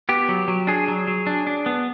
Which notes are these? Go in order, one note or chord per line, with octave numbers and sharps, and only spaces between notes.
B3 G4
F#3
F#3
D4 G#4
F#3
F#3
D4
D4
B3